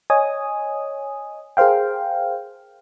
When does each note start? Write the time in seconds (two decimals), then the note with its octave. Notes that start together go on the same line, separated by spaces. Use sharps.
0.10 C#5 D#5 G#5 D#6
1.57 G#4 A#4 C5 F5 G5